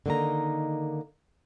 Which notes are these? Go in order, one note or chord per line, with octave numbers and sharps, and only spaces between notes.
D3 D#3 A#3 D#4 A#5